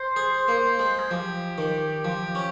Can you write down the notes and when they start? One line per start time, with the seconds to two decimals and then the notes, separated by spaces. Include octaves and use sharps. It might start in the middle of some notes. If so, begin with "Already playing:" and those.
Already playing: C5
0.16 G#4
0.48 A#3
0.79 G#3
0.99 G#4
1.10 F3 G4
1.58 D#3
2.05 F3
2.35 C#4